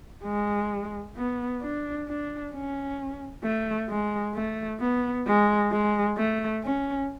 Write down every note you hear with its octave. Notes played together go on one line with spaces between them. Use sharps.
G#3
B3
D4
D4
C#4
A3
G#3
A3
B3
G#3
G#3
A3
C#4